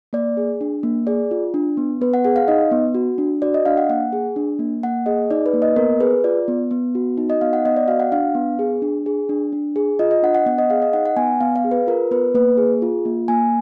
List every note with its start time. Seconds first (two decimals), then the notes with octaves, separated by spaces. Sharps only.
0.13 A#3 D5
0.37 G#4
0.61 D4
0.83 A#3
1.07 G#4 D5
1.31 F4
1.54 D4
1.77 B3
2.01 B3 B4
2.14 F#5
2.24 G#4 F#5
2.36 F5
2.48 D#4 D#5
2.71 B3
2.95 F#4
3.18 D4
3.42 F#4 D5
3.54 D#5
3.66 D4 F5
3.77 F#5
3.89 A#3 F#5
4.13 G#4
4.36 D4
4.59 A#3
4.83 A#3 F#5
5.06 G#4 D#5
5.31 D#4 D5
5.46 B4
5.54 A#3
5.62 D#5
5.76 B3 A#4
6.00 G#4 B4
6.24 F4 D5
6.48 B3
6.71 B3
6.95 F#4
7.17 D#4
7.30 D#5
7.41 B3 F5
7.53 F#5
7.65 B3 D#5
7.76 D5
7.88 F#4 F5
8.00 F#5
8.12 D4 F5
8.35 B3
8.59 G#4
8.82 D4
9.06 G#4
9.29 D4
9.52 D4
9.76 G#4
9.99 F4 D#5
10.11 D#5
10.23 D4 F#5
10.35 F#5
10.46 B3 F#5
10.58 D#5
10.70 G#4 F5
10.82 D#5
10.93 D#4 F#5
11.06 F#5
11.17 B3 G#5
11.41 B3 F5
11.56 F5
11.64 G#4
11.71 B4
11.87 F4 A#4
12.11 B3 B4
12.34 A#3 B4
12.57 G#4
12.82 F4
13.05 A#3
13.28 A#3 G#5